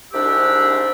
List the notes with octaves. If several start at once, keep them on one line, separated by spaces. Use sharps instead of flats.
C2 G#2 C3 D4 G4 E6